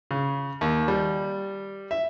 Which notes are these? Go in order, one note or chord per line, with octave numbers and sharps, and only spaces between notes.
C#3
D#2
G3
E5